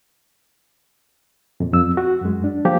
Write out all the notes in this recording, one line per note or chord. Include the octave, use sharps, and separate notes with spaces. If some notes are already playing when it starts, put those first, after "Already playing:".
F2 A#2
F2 E6
F#4
F#2 G#3
D4
F3 G3 A#3 F4 G4